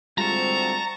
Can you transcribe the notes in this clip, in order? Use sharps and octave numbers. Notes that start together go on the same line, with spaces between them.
D2 G3 G#3 C4 F4 A5 A#5 C#6